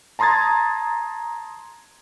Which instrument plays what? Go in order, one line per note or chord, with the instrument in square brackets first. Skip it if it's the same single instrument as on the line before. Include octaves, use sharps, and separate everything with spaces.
[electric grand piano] A5 A#5 C6 D#6 G#6 A6